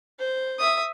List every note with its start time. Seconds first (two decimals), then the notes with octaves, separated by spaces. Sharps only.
0.19 C5
0.59 E5 D#6